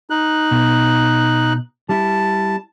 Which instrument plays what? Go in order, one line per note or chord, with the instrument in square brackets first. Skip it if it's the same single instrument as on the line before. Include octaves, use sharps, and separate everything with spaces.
[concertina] D#4 F#6
[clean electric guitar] B2
[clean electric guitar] G3 E4 [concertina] A5